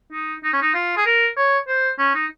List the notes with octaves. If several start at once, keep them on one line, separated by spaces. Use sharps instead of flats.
D#4
D#4
C#4
D#4
F4
G#4
A#4
C#5
C5
C#4
D#4